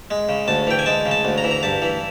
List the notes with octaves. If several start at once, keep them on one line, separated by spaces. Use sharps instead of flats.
G#3
C#3
D2 A5
E3 G5
G#5
G#3 A5
C#3
A5
D2
A#5
E3
A#5
G2 A5
E3